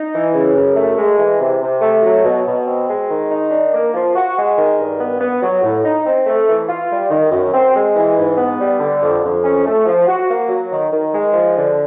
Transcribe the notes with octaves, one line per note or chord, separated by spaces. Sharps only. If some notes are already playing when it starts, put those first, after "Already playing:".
Already playing: D#4
E3
C#3
F#2
A3
G#3
E3
C3
C3
A3
F#3
B2
B2
C4
G#3
D#3
D#4
D4
A#3
F3
F#4
G#3
D#3
G2
B3
B3
F#3
A2
D#4
C4
A3
E3
F4
G3
D#3
F#2
C4
G#3
E3
G#2
B3
G3
D3
F2
F2
C#4
A3
F3
F#4
A#3
F#3
D#3
D#3
G#3
F3
D3